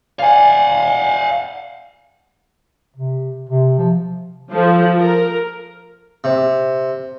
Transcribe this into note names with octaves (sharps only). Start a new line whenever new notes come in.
D5 F5 F#5 G#5
C3
C3
F3
F3 A4
A#4
C3